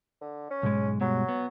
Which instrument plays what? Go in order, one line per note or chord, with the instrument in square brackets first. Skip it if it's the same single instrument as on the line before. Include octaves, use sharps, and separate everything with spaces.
[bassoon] D3
C#4
[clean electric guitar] B1 G#2 G#3
[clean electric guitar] G2 B2 G#3 [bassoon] F#3
[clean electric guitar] B3